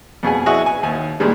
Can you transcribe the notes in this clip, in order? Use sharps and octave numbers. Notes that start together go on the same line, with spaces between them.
F2 B2 G#4 G#5
E4 F#4 G#4 D#5 G#5
G#5
D#2 G#5
A#2 D#3 G3 G#3